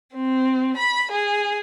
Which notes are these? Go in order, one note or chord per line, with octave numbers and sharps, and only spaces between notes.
C4
B5
G#4